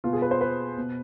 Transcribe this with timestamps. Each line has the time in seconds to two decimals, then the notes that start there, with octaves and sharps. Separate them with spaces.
0.04 B2 F4
0.13 G#4
0.22 B4
0.31 C5
0.41 B4
0.78 B2